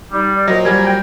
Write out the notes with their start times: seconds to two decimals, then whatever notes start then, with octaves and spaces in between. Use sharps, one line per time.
0.12 G3 D#4
0.36 D5
0.48 A#2 F#3 C5 D#5 A#5
0.65 F#3 G3 A#4 G#5
0.86 G5